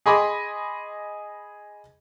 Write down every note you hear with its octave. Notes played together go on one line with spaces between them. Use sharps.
G#4 D#5 G#5 B5 C6 D6